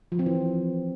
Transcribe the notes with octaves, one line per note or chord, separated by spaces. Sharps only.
F3
C4
E3